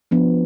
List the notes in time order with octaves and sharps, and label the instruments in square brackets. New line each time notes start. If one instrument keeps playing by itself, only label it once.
[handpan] F3 B3 D4